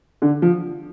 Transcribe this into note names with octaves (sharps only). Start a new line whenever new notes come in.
D3
F3